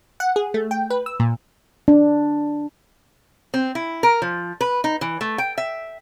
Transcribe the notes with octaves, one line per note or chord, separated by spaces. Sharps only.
F#5
G#4
A3
G5
B4
E6
A#2
D4
C4
E4
A#4
F3
B4
D#4
E3
A3
G5
E5